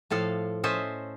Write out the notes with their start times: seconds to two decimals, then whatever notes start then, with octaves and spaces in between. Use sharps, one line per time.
0.10 A2 F3 A4 F5
0.64 C#4 A4 C5 D#5 E5 A5